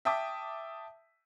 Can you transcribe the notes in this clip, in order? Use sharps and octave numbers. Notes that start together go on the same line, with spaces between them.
E5 G5 A5 D6 D#6 B6